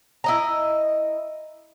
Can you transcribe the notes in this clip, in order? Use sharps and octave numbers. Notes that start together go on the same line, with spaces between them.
E4 D#5 A#5